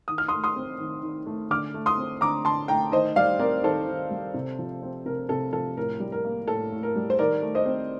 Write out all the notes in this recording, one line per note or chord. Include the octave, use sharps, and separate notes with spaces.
D#3 D#6
F6
A3 C6 D#6
C6 D#6
C4
D#3
D#3
A3
D3 D6 F6
A3
C6 D#6
C4
D3 A#5 D6
D3 A5 C6
A3 G5 A#5
D#3 C5 D#5
G3 D5 F5
C4 A#4 D5
D#3 A4 C5
D#3
G3
C3
F3
C4
C3 A#4
C3 A4
F3 A4
A2 A#4
G3
A#4
A#3
A2 A4
A2
A#4
G3
C5
D#3 A#4 D5
A3
C5 D#5
C4